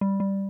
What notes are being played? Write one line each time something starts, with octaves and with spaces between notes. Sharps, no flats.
G3
G3